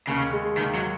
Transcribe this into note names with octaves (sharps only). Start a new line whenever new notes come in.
D#2 C#3
G#3
D#2 D#3
F#3